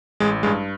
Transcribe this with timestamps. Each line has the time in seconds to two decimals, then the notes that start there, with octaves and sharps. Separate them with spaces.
0.20 A1 G#3
0.43 G2 G#3